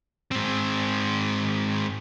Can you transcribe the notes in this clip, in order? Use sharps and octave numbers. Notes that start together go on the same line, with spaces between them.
G#2 C4